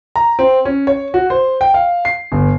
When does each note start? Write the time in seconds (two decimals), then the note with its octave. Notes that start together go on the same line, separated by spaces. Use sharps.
0.16 A#5
0.39 C4
0.65 C#4
0.87 C#5
1.14 F#4
1.30 C5
1.61 G5
1.74 F5
2.05 C7
2.32 G1